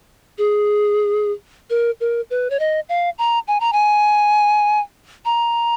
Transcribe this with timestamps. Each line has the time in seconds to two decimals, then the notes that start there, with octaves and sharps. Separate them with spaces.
0.38 G#4
1.70 A#4
2.01 A#4
2.30 B4
2.50 C#5
2.60 D#5
2.89 F5
3.18 A#5
3.48 G#5
3.60 A#5
3.73 G#5
5.25 A#5